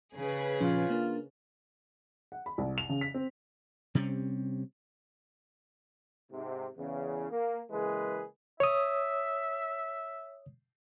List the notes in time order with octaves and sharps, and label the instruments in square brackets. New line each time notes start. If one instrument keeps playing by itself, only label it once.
[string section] C#3 G#4 B4
[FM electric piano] A#2 F3 C#4 [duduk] F4
[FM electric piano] A#3 D4 A#4
[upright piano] F#5
B5
C2
F7
C#3
B6
C4
[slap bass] C3 G3 C4 C#4
[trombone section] G#2 C3
E2 C#3
A#3
C#3 E3 G#3 A#3 G#4 B4
[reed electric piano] C#5 D#6 [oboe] E5